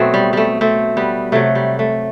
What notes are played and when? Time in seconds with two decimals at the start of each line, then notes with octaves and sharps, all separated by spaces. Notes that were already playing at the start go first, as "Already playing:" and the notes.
Already playing: B2 F#3 A3 C4
0.14 G3
0.33 G3 A3
0.61 A3 C4
0.97 G3 B3
1.32 C3 F#3 A3
1.55 G3
1.79 A3